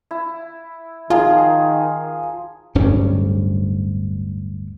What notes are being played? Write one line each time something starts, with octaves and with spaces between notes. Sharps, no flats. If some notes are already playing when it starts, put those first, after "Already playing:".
E4
D#3 F3 F4 G#4 F5 A#5
D1 G2 G3 C#4